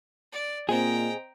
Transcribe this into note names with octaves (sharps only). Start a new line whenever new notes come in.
D5
A#2 C4 G#4 C5 D#5 G5 A#5